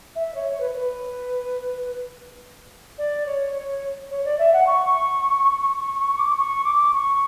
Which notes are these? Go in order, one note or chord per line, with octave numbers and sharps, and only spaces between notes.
E5
C#5
C#5
B4
B4
D5
C#5
C#5
C#5
D5
E5
F#5
C#6
C#6
C#6
D6
C#6
D6
C#6